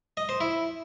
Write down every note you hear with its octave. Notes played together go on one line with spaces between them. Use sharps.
D#5
C5
E4